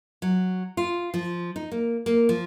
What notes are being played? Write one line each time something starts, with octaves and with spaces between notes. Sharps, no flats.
F#3
F4
F3
D#4
A#3
A#3
F3